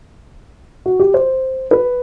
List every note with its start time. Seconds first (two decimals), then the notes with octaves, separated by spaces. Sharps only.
0.86 F#4
1.00 G4
1.14 C5
1.71 B4